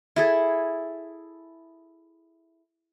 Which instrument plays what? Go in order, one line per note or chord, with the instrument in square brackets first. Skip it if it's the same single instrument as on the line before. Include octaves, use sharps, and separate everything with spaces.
[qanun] E4 G#4 A4